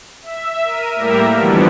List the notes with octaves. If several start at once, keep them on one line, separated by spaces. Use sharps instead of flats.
E5
A#4 D#7
A2 G3 A#3 G4 A#4 E5
B2 D3 E3 F3 G3 B3